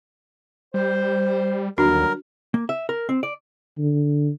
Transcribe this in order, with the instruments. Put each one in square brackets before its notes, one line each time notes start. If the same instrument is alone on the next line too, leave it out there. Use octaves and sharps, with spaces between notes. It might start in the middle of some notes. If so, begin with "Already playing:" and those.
[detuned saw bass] G3 [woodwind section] C5
[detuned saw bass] D#2 [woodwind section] D3 F#3 G3 [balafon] D4 F#4 [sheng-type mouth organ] A#4
[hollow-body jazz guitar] A#3
E5
A#4
C4
D5
[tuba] D3